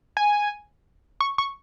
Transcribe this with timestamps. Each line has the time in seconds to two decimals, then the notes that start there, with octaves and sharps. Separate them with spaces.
0.17 G#5
1.21 C#6
1.38 C#6